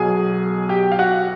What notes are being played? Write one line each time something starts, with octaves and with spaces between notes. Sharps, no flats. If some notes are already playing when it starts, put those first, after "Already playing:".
Already playing: B1 B2 F#3 G#4 G#5
G4 G5
F5
F#4 F#5